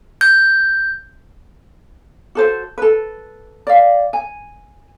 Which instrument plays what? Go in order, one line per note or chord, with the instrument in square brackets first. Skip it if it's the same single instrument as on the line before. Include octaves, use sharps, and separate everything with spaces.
[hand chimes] G6
[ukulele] F#4 A4 C5
A4 B4
D5 F5
G#5